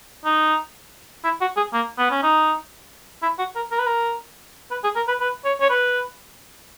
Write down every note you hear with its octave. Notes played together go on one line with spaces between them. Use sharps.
D#4
E4
F#4
G#4
A#3
B3
C#4
D#4
E4
F#4
A#4
A#4
B4
A#4
B4
G#4
A#4
B4
B4
C#5
C#5
B4